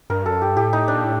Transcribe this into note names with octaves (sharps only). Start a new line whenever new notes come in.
G2 A#4
F#2 A4
G2 G4
A2 G4
D#4
D4
A#2
A2